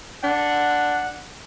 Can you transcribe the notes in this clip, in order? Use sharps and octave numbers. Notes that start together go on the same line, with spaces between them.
D4 F#5